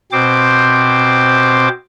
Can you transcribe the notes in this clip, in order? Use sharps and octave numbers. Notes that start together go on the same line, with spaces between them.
B2 C4 C5 D6